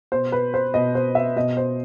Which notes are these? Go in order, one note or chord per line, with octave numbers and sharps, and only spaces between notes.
B2 C5
B4
C5
B2 D#5
C5
E5
B2 D#5
C5